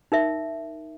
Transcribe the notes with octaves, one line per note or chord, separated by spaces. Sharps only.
D#4 A#4 E5